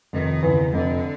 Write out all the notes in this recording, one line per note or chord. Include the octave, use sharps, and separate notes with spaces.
F1 D#3
E2 C#3
F1 D3